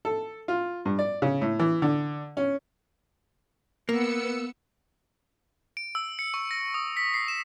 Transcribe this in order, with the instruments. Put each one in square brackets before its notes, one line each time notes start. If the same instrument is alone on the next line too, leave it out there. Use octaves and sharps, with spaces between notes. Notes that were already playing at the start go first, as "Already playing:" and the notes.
[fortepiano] A4
F4
G2
D5
C#3
A2
E3
D3
C#4
[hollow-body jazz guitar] A#3 [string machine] B3 E6 C#7
[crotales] D7
E6
C#7
C#6
A#6
D#6
B6
C7
E7